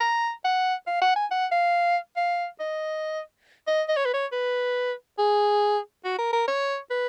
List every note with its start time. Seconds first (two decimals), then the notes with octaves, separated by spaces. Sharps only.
0.01 A#5
0.44 F#5
0.87 F5
1.01 F#5
1.16 G#5
1.31 F#5
1.52 F5
2.17 F5
2.60 D#5
3.67 D#5
3.88 D#5
3.97 C#5
4.05 B4
4.14 C#5
4.32 B4
5.18 G#4
6.05 F#4
6.18 A#4
6.33 A#4
6.48 C#5
6.90 B4